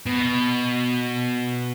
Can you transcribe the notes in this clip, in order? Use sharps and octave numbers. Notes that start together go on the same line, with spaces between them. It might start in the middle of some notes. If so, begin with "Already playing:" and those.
B2